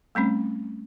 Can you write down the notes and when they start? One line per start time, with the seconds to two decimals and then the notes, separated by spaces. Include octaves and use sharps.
0.15 G3 A3 C4 C#4